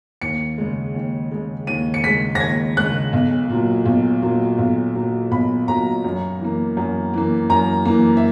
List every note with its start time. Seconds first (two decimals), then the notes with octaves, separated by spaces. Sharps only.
0.22 D#2 C#7
0.58 C#3 G#3
0.94 D#2
1.31 C#3 G#3
1.67 D#2 D#7
1.94 C#7
2.03 C#3 G#3 B6
2.35 A#6
2.40 D#2 G#6
2.77 C#3 G#3 F#6
3.13 B1
3.49 A#2 F#3
3.85 B1
4.22 A#2 F#3
4.58 B1
4.95 A#2 F#3
5.31 B1 B5
5.68 A#2 F#3 A#5
6.04 F#2
6.40 E3 A#3
6.77 F#2
7.14 E3 A#3
7.50 F#2 A#5
7.85 E3 A#3
8.17 E5